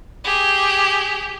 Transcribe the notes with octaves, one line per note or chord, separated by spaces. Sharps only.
G4 G#4